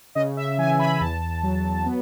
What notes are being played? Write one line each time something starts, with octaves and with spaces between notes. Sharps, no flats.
C#3 D#5
E5
E3 G#5
B5
E2 A5
F#3
B3